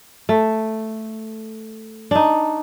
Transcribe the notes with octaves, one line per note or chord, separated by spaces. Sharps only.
A3
D4 D#4